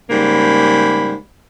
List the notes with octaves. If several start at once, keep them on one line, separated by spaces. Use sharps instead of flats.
G#2 C#3 G3 A#3 B5